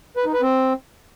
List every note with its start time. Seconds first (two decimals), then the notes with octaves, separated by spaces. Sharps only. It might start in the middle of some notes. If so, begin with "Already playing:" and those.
0.17 B4
0.25 D#4
0.33 B4
0.42 C4